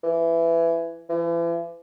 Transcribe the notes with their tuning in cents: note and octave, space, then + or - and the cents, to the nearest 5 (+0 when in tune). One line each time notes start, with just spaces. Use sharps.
E3 +15
E3 +40